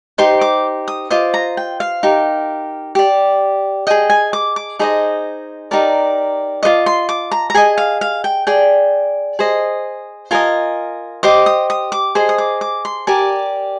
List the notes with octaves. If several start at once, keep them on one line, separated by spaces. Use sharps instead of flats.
D#4 G4 C5 C6
D6
D#6
F4 C5 D#5 D6
A#5
G5
F5
D#4 G4 A#4
G4 D5
G#4 D#5 G5
G#5
D6
D6
D#4 G#4 C5 D#5
D#4 G4 A#4 D5
F4 C5 D#5 D6
C6
D6
A#5
A#5
G#4 D#5 G#5
F5
F5
G5
G#4 D5 G5
G#4 C5 D#5
F4 A#4 D#5 G#5
G4 C5 D#5 D6
D#6
D#6
D6
G#4 C5 D#5
D#6
D6
D6
C6
G4 A#4 D5 G#5